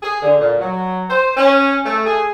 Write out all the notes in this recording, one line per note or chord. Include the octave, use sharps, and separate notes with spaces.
G#4
D3
A#2
F#3
C5
C#4
A3
G#4